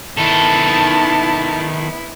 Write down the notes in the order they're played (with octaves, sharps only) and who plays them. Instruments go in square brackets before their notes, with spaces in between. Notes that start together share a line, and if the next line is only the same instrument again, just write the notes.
[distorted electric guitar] D#3 A4 [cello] B3 E4 [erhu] A5